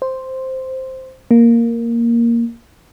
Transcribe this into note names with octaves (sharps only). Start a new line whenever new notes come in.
C5
A#3